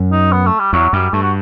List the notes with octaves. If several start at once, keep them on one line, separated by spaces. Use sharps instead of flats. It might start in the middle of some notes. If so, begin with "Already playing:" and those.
Already playing: F#2
D#4
B3
A3
G3
E2 F#3
F#2 G3
G2 A3
F#4